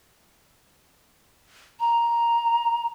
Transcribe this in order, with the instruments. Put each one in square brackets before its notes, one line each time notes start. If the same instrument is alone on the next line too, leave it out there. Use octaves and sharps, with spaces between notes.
[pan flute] A#5